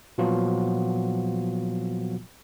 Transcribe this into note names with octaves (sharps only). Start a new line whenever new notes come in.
A#2 F3 F#3 B3 F4 F#4